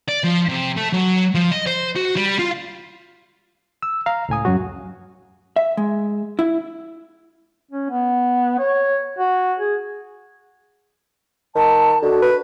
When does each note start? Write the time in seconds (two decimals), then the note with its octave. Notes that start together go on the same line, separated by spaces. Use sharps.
0.08 D5
0.24 F3
0.48 C3
0.77 A3
0.93 F#3
1.35 F3
1.52 D#5
1.67 C5
1.95 F#4
2.16 G3
2.39 F4
3.83 E6
4.06 F5 A#5
4.29 C#2 A2 G#5 D#6
4.45 F#2 F#3 F#4
5.56 E5
5.77 G#3
6.39 E4
7.71 C#4
7.90 B3
8.59 C#5
9.18 F#4
9.59 G#4
11.55 D#3 A5
12.02 D3 F#4
12.22 B4